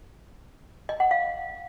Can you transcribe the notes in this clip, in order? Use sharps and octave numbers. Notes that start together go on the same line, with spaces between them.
D#5
F#5
F5